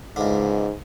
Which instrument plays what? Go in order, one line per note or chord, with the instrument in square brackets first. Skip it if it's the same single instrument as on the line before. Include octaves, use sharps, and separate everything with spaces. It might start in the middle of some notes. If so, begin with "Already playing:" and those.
[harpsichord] C#2 D3 [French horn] G#2